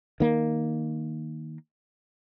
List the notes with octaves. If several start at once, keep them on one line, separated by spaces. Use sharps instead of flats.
D#3 A#3